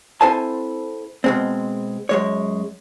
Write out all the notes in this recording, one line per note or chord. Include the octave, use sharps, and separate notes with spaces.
C4 E4 A4 C5 G#5 A5
B2 G#3 C4
F#2 G#3 C#5